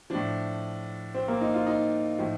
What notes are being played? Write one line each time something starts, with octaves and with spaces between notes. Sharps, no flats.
A2 F3 D4
C4
A#3
D#4
F4
D#4
A2 F3